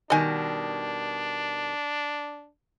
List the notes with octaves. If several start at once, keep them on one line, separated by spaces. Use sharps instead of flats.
B2 D#3 G3 D4 D#5 G#5